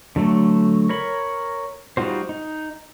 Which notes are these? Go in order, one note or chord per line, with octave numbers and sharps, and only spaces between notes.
D3 F#3 A3
A#4 C#5 B5
G3 D#4 F4 F#4 C5
D#4